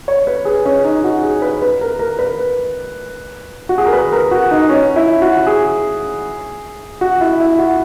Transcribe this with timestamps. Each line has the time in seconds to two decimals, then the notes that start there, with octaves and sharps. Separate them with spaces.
0.08 C#5
0.27 B4
0.45 G#4
0.65 C#4
0.85 D#4
1.04 F#4
1.23 G#4
1.42 B4
1.62 B4
1.81 A#4
1.99 A#4
2.19 B4
3.69 F#4
3.78 G#4
3.86 A#4
3.93 B4
4.12 A#4
4.31 F#4
4.51 D#4
4.69 C#4
4.96 E4
5.22 F#4
5.47 G#4
7.01 F#4
7.21 E4
7.40 E4
7.58 F#4